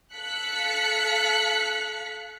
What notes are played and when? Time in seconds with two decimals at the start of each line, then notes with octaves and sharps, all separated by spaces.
0.14 A4 F5 F#6 B6 C#7